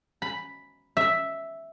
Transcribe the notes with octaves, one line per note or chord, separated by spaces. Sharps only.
B5
E5